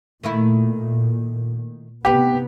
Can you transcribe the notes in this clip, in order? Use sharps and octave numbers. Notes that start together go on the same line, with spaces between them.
A#2 D#3 A3 E4
C3 B3 D#4 G4 B4